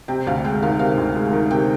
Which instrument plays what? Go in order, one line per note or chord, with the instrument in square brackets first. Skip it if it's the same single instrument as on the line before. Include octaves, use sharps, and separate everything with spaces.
[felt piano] C3 G5
D2 F5
G#3 G5
D#3 F5
C3 F5
D2
G#3
D#3
C3 G5